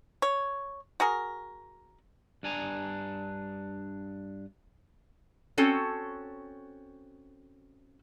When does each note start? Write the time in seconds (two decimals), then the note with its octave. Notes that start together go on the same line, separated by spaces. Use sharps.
0.22 C#5
1.00 F#4 G#4 A#4
2.43 G2 D4 G#5 A#5
5.58 C4 C#4 F#4 A4